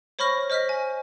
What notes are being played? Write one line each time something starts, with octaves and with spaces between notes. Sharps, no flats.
C5 C#5 B5 C#6 F6 A#6
C5 D#5 F6 A#6 B6
G#5